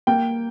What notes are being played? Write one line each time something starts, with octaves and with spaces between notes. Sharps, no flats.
A#3 G5